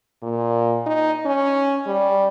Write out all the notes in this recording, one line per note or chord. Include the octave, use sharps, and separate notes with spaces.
A#2
D#4
C#4
G3